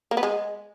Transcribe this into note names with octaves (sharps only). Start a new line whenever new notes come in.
A#3
B3
G#3